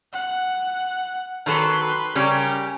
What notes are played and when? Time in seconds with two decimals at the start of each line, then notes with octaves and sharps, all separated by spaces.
0.13 F#5
1.46 D#3 F#3 A4 B4 C6
2.15 C#3 G3 C#4 G4 A#4